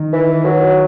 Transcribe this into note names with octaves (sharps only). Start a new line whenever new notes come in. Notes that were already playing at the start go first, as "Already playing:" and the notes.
Already playing: D#3
E3
F#3